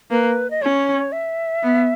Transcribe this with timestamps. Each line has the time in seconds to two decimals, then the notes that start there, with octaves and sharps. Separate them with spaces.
0.11 A#3 B4
0.50 D#5
0.62 C#4 C#5
1.12 E5
1.63 B3